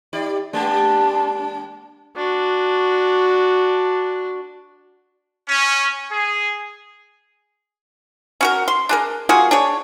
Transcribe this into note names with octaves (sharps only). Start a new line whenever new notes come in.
D#4 G4 D5
G#3 A#3 D4 G4
D4 F#4
C#4
G#4
C#4 F#4 A#4
C6
D4 G#4 A#4
A#3 F4 F#4 G#4
D4 G#4 C#5